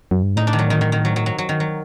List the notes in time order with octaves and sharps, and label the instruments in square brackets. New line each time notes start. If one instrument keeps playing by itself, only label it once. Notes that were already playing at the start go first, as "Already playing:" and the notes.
[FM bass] F#2
G2
[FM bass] A2 [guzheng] D#4
[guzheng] D4
D#3
F#3
D#3
D#3
D#3
F#3
F#3
F#3
F#3
D#3
F#3